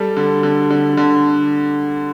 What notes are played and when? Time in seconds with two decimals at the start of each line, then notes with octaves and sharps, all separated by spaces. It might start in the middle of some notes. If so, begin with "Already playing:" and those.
Already playing: G3 A4
0.17 D3
0.43 D3
0.71 D3
0.97 D3